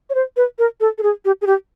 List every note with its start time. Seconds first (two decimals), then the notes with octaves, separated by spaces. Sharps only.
0.10 C#5
0.15 C5
0.37 B4
0.59 A#4
0.80 A4
0.98 A4
1.03 G#4
1.25 G4
1.41 G#4
1.47 G4